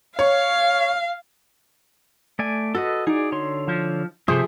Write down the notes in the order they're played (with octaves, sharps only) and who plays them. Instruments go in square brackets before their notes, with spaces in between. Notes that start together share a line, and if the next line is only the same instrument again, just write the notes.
[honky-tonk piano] C#5 [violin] F5
[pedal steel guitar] A3 D5 G#5
[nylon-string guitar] F#4 [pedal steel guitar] A4 B4 D#5
[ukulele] D#4 [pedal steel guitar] G#4 D5
[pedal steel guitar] D3 C#5 C6
[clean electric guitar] F3
[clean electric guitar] C3 C5 [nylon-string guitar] F3 A3 G#4 [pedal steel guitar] G4 E5 D#6